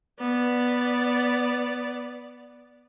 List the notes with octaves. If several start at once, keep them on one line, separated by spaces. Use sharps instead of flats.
B3 D5